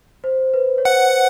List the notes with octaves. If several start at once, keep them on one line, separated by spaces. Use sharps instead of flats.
C5
B4
C#5
C5 F#5